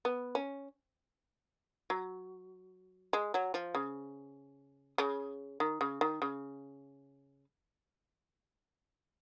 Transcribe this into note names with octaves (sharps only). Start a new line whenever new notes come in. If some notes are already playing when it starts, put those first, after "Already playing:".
B3
C#4
F#3
G#3
F#3
F3
C#3
C#3
D#3
C#3
D#3
C#3